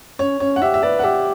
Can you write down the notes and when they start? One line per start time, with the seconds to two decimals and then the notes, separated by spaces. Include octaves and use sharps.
0.19 C#4 C#5
0.40 C#4 C#5
0.56 F#5
0.62 G4 E5
0.74 E5
0.83 B4 D5
0.99 F#5
1.04 G4 E5